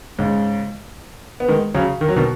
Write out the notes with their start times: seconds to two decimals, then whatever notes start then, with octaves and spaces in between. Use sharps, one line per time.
0.19 G#2 C#3
1.40 B3
1.48 D#3 G#3
1.74 C#3 F#3
2.01 D#3
2.08 F#3
2.16 B2 D#3